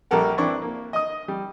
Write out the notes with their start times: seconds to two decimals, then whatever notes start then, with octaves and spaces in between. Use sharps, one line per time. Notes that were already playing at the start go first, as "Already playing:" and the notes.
0.11 A#1 G3 A#3 A4 A#4 F#5
0.38 E3 C4 D4 E4 C#6
0.62 A#3
0.93 D#5 D#6
1.28 G3